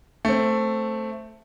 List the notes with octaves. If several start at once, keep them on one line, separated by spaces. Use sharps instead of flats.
A3 C4